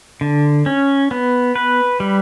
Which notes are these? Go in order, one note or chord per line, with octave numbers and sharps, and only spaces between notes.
D3
C#4
B3
B4
G3